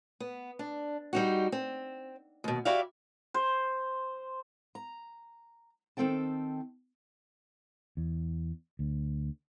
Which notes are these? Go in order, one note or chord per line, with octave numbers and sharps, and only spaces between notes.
B3
D4
G3 D#4 F#4
C4
D#2 B2
E4 F#4 G4 D5 E5 F5
C5
A#5
D#3 G#3 C4 A4 G5 A5
E2
D2